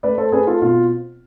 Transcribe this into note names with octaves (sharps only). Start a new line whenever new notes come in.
A3 B4 D5
A4 C5
C4 G#4 B4
F4 A4
B2 F4